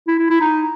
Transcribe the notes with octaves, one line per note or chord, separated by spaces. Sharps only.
E4
E4
E4
D#4